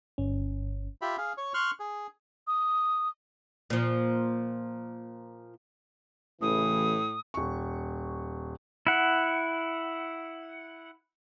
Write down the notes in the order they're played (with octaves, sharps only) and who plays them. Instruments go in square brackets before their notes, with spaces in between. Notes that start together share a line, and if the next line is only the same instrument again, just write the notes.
[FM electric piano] G1 C#4
[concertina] F4 G4 E5 B5
G#4 F5
C#5 C#6
C6 C#6 F6 F#6
G#4
[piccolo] D#6
[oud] A#2 F3
[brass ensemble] A1 C#3 E3 [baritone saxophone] A2 [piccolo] D#6
[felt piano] D#1 C#6
[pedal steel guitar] E4 F#5